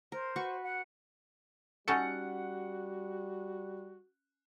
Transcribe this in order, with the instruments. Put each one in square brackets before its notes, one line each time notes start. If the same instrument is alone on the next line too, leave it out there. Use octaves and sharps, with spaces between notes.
[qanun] A#4 [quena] C5
[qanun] F#4 B4 C#6
[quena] F#5
[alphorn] G3 [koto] C#4 D#4 A4 [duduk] F#4 [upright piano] F#5 C#7